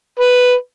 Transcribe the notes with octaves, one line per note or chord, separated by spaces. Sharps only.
B4